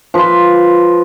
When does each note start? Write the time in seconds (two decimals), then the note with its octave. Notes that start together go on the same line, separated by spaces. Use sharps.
0.14 F3 B4